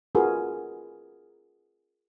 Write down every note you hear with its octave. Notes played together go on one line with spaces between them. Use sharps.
F4 F#4 G#4 A#4 B4